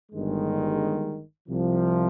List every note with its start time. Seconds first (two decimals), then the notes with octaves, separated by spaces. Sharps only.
0.12 G1 G2 D#3 G#3
1.48 C2 C3 F3